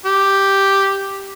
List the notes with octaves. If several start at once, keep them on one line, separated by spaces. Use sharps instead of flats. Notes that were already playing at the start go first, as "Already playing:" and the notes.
G4